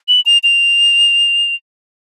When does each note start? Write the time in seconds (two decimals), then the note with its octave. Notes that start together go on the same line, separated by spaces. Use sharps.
0.08 F#7
0.26 F7
0.43 F7